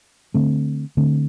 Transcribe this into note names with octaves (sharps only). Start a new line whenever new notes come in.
D3 A3 C4
D3 A3 C4